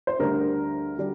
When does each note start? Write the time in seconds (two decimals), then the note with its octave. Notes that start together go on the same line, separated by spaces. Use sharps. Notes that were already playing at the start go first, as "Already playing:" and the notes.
0.07 C5
0.19 D2 D3 G3 D4 A#4
0.98 D3 G3 D4